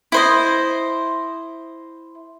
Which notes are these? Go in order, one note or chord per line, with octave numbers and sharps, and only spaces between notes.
E4 C5 D#5